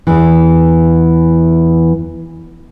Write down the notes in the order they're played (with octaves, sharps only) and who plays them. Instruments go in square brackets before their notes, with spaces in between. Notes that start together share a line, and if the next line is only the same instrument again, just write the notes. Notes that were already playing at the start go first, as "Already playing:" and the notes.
[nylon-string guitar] E2 E3